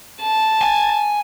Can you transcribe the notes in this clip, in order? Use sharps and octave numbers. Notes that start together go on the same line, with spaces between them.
A5
G#5